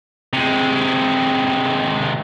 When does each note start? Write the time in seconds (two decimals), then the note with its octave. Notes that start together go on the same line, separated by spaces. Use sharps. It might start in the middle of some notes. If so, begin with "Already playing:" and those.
0.33 C3 G#3